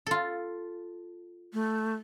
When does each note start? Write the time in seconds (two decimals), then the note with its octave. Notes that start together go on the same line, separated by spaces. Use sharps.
0.06 F4 A4
1.53 A3